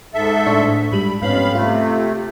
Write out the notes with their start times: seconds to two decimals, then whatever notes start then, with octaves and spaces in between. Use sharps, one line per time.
0.14 G#2 A4 E5
0.46 A2 D4 C#6
0.92 G#2 G3 B5
1.22 F2 G#2 B3 C#4 F5 B5
1.55 C3 A3 F4